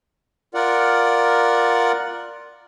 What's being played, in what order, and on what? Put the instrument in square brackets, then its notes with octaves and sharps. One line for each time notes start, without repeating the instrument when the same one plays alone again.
[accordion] F4 A#4 D5 F#5